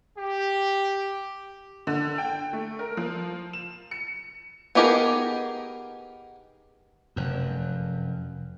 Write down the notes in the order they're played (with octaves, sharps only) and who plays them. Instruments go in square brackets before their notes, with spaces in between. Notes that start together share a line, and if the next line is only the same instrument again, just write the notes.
[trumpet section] G4
[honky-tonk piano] D3
G5
A3
A#4
F3
E7
C#7
[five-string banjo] B3 D#4 G4 G#4 A#4
[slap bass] F1 F#2